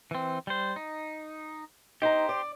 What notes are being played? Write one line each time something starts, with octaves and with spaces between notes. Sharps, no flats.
E3 C4
G3 C5
D#4
D#4 G4 C5 A#5
D5